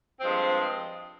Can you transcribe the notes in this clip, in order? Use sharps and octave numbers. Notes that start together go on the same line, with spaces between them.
G2 F3 G#3 C4